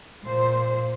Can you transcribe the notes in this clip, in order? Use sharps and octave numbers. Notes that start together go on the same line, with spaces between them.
A#2 C5